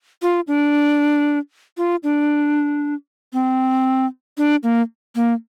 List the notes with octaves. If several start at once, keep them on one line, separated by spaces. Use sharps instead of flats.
F4
D4
F4
D4
C4
D4
A#3
A#3